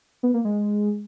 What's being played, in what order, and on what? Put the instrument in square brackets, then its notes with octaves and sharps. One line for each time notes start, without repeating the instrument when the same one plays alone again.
[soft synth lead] B3
A#3
G#3